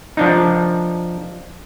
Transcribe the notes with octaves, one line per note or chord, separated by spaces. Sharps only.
F3 D4 D#4